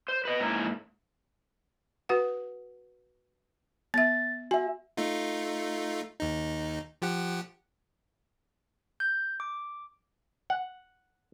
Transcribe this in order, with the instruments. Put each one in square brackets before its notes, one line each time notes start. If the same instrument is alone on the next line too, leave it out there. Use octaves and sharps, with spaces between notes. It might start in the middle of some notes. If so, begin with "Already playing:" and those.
[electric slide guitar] C5
B4 D#5
G#2 A#3 C#4 E4 A#4
[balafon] F#4 B4 F#5
[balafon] B3 E5 [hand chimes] A6
[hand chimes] F#4 E5 [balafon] G#5
[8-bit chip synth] A3 D#4 F4
D#2 D#4
F3 G4 F#5
[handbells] G6
D6
[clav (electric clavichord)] F#5